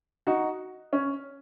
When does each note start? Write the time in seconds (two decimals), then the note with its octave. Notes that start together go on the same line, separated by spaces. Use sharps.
0.27 D#4 F#4
0.93 C#4